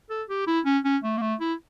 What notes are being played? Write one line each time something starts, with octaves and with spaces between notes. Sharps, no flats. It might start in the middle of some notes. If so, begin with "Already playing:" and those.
A4
G4
E4
C#4
C#4
A3
A#3
A3
E4